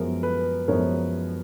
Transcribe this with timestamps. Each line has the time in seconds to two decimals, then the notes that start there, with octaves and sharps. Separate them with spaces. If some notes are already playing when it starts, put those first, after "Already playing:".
Already playing: F#2 F3 G#3 B3 A#4
0.23 B4
0.68 F#2 F3 G#3 B3 A#4 C#5